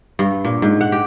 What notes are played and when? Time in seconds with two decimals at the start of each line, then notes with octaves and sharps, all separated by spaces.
0.19 G2
0.45 A#2
0.62 G#2
0.81 F#5
0.92 G4